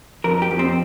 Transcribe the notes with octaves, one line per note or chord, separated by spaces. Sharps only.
F2 A#4
G4
F2
C4